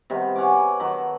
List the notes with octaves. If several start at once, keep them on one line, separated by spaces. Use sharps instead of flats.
C3 D#3 G3 B3
C#5 F#5 G#5 D6
D#3 F#3 A5 B5